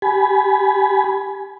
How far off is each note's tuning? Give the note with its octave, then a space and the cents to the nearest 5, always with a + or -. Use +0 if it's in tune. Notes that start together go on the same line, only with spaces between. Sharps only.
G4 +0 G#5 +25 B5 +0